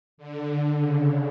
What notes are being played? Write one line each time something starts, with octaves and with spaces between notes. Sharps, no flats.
D3
C#3